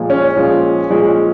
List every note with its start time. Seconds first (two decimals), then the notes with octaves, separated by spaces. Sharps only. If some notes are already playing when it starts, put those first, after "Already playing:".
Already playing: A#2 F3 G#3
0.10 C#4
0.36 A#2 F3 G#3
0.90 A#2 F3 G#3